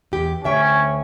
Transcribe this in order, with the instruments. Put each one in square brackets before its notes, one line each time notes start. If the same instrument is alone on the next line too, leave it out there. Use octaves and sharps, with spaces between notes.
[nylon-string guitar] E2 G4
[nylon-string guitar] D2 E5 G5 [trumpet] C#4